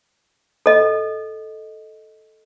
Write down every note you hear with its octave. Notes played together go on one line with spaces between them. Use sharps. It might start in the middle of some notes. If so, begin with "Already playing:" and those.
A4 D#5